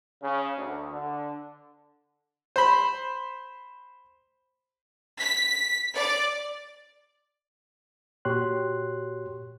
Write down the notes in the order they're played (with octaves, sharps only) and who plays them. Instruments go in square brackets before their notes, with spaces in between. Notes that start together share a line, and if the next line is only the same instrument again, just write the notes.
[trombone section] C#3
D2
D3
[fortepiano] C5 B5
[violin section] B6
D5
[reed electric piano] A#2 F#4 G4 C#5 C6 F#6